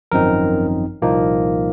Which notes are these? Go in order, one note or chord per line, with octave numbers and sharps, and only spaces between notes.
G#1 F#2 F3 C4 D#4 A#4
C2 A#2 F3 A#3 D#4